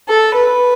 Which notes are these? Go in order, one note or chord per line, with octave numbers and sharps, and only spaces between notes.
A4
B4